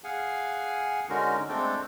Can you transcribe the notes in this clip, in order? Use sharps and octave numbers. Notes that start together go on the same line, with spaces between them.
G#4 F5 F#5 G#5
D3 G#3 C#4 D#4 F#4 A#4
G#3 A3 C4 D4 A4 G5